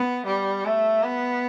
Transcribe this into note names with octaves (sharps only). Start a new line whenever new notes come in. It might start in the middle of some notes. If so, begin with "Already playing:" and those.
Already playing: B3
G3
A3
B3